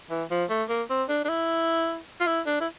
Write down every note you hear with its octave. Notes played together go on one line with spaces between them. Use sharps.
E3
F3
A3
A#3
C4
D4
D4
E4
F4
E4
D4
E4